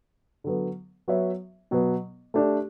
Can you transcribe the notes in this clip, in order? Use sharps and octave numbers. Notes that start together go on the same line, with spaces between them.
D3 F#3 B3
F#3 B3 F#4 C#5 E5
B2 F#3 B3
A3 D4 G4 D5